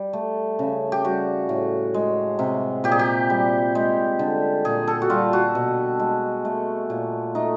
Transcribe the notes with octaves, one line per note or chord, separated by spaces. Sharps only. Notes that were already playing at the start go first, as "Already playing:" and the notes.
Already playing: G3
A3
C#3
G4
G3 F#4
A2
G#3
C3
A#2 G4
G#4
G4
G3
G#3
D3
A#2 G#4
A4
F#4
G3 F4
F#4
B2
G#3
A3
A#2
A3 D#4